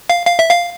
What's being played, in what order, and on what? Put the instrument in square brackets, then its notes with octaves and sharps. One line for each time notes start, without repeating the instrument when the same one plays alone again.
[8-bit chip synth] F5
F5
E5
F5